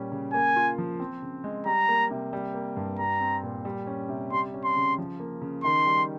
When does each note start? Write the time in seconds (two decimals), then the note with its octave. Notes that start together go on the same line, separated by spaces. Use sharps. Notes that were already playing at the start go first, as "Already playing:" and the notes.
Already playing: A#2 G3 C#4
0.12 C#3
0.33 A#3 G#5
0.56 F4
0.78 F3
1.00 C4
1.22 C#3
1.44 G#3
1.66 G3 A#5
1.89 A#3
2.11 C3
2.33 G3
2.54 A#3
2.76 G2
2.99 G3 A#5
3.20 C4
3.43 A#2
3.65 G3
3.87 C#4
4.09 C3
4.31 G3 C6
4.54 C#4
4.64 C6
4.76 C#3
4.98 F3
5.20 A#3
5.42 C#3
5.64 D#3 C6
5.86 G3